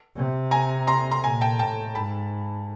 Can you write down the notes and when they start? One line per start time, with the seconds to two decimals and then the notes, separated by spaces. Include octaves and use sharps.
0.16 C3
0.51 G#5 A#5
0.87 A#5 C6
1.11 A#5 C6
1.24 A#2 G#5 A#5
1.41 G5 A5
1.59 A2 G5 A5
1.95 G#2 A5 B5